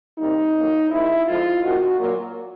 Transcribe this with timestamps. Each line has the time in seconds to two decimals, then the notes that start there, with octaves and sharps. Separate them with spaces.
0.19 C3 D#3 G3 A#3 D#4
0.55 F2 C#3 F#3 A#3
0.91 C3 D#3 G#3 E4
1.27 F2 D3 F3 G#3 F4
1.63 C3 D#3 G#3 F#4
1.99 A#2 F#3 A#3